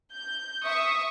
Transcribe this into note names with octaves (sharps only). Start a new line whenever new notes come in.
G6
E5 C#6 D#6